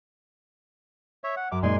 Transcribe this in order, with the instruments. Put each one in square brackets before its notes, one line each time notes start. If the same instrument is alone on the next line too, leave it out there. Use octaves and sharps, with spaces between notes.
[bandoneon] C#5 E5
F#5
[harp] F#2 [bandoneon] D6
[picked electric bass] F#2 A#2 G#3 [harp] D#4 D5 [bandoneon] G#5 C6